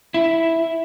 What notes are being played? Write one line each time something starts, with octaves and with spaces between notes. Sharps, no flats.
E4